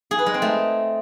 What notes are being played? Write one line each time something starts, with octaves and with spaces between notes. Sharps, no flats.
G#4
B4
G#3
C4
A3